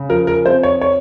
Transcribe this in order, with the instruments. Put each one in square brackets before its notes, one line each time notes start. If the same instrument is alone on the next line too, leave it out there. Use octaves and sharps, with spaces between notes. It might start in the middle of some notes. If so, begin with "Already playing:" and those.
Already playing: [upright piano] C#3
F3 A#4
A#4
C4 C5
C#5
C#5